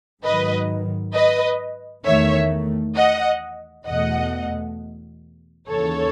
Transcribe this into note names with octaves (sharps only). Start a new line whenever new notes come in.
G#2 D#3 F#3 B4 D#5
B4 D#5
E2 D#3 A3 C#5 E5
D#5 F#5
E2 B2 A3 D#5 F#5
D#2 C#3 E3 A4 C#5